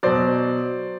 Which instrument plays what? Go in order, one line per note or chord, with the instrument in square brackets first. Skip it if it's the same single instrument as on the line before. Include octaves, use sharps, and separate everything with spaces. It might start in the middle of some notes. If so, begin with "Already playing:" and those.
[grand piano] B2 F#3 C5 D5